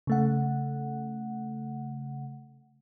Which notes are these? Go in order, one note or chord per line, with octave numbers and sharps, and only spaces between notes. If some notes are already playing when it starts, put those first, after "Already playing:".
C#3 A3 F#5